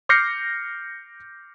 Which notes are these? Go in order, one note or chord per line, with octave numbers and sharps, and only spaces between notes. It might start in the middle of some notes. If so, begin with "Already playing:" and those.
D6 F6 G6 A#6 C7 C#7